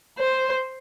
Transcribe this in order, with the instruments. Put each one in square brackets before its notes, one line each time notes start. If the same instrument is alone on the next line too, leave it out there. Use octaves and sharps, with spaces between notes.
[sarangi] C5